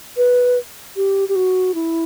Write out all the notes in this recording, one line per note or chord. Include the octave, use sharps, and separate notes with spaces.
B4
G4
G4
F#4
E4